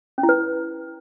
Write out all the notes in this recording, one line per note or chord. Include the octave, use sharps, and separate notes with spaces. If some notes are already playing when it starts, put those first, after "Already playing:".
C#4
E4
B4